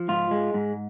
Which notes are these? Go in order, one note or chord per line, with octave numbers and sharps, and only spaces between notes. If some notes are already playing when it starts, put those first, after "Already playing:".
Already playing: F3
G#2 F4
G#3
G#2